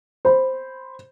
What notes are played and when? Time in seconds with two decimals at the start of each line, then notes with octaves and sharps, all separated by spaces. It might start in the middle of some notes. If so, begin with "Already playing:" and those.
0.25 C5 B5